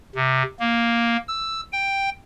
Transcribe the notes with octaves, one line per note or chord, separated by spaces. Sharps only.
C3
A#3
E6
G5